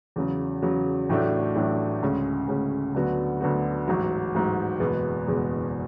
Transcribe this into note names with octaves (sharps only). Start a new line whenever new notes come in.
E2 C#3 F#3
E2 C#3 F#3
A1 A2 F#3 A3 D4
A1 A2 F#3 A3 D4
D2 C#3 G#3 C#4
D2 C#3 G#3 C#4
D2 D3 F#3 B3 F#4
D2 D3 F#3 B3 F#4
A1 G#2 F#3
A1 G#2 F#3
F#1 E2 B2 G#3 B3
F#1 E2 B2 G#3 B3